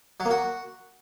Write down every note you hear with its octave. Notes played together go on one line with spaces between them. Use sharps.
F#3
A#3
F#4